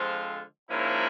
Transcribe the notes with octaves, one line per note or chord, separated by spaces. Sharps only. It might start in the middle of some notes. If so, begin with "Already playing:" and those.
Already playing: D3 F3 G#3 C4 F4
G#2 F3 A#3 C#4 E4